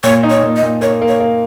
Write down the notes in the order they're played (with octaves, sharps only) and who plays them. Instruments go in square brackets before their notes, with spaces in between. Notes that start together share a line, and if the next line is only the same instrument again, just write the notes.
[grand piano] A#2 [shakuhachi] C#5
[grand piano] D#4
[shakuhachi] C#5
[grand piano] A#2
[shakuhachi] D#5
[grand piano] A#2
[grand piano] A#3 [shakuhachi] C#5
[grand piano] A#3
[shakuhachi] C#5
[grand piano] A#3